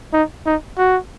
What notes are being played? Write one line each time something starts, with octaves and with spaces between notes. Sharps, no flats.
D#4
D#4
F#4